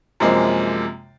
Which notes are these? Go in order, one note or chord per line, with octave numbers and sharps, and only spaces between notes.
F#2 C3 F3 G#3 A#3